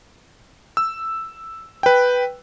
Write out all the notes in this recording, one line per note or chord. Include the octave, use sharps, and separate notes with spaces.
E6
B4 G5